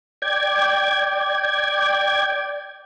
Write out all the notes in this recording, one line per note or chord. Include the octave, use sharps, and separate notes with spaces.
D5 G5 G#6